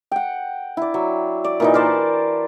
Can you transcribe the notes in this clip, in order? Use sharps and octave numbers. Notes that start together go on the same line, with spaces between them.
F#5 G5
E4 D5
F#3
D5
A#2 E3 D#4
A#4 C5 D5 A5